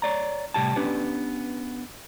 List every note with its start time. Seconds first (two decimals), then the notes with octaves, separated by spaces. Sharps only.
0.02 C#5 D5 A#5
0.54 A2 C3 G3 G4 G5 A5
0.76 B3 C#4 D4 G4 B4